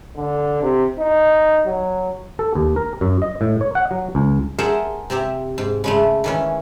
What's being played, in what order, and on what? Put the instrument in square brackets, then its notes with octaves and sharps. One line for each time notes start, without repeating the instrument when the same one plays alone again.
[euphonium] D3
C3
D#4
F#3
[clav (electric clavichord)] A4
D#2
A#4
F#2
D#5
A2
C#5
F#5
F#3
C#2
[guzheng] G#4 A#4 C5 E5 F#5 A5
C3 C4 G4 E5
G#2
C#3 G#3 A3
D#3 E3 C#4